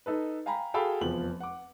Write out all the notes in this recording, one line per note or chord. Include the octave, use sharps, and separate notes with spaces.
D#4 A4 B4
F5 G5 G#5 A#5 B5
F#4 G#4 A4 F5 G5 B5
F1 E2 F3 F#7
F#5 D6